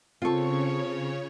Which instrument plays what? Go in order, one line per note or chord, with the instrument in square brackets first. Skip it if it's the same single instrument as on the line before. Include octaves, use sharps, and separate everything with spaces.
[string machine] C#3 C#5 [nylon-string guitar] C4 A4 [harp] F4 C#6